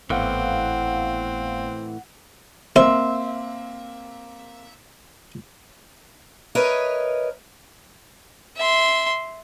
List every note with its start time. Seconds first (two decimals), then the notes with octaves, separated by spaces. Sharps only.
0.10 G#1 A2 E3 B3 C4 F5 F#5
2.76 A#3 C4 C5 E5 C6
6.55 A#4 B4 C#5 D#5 E5
8.57 E5 C6